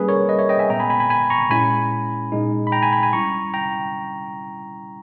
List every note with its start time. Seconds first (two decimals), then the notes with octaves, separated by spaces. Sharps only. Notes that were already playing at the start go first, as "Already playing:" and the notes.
Already playing: G3 A#3 C#4 G#4 B4
0.08 A#4 C#5
0.29 B4 D#5
0.39 C#5 E5
0.49 D#5 G5
0.59 E5 G#5
0.70 A#2 G#3 B3 G5 A#5
0.80 G#5 B5
0.90 G#5 B5
1.00 G#5 B5
1.10 G#5 B5
1.30 A#5 C#6
1.50 A#2 G#3 C#4 E4 G#5 B5
2.32 A#2 G#3 D#4
2.67 B5
2.72 G5 A#5
2.82 G#5 B5
2.92 G#5 B5
3.03 G#5 B5
3.13 G3 C#4 E4 A#5 C#6
3.54 G5 A#5